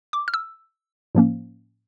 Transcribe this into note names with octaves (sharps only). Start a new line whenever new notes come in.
D6
F6
E6
A2 F3 A#3 C#4